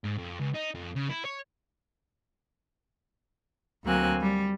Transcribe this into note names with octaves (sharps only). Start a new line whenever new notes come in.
G#2
F2
C#2
D#4
F2
C#3
E4
C#5
D2 F#3 A#3 C4 G#5 F#6
G3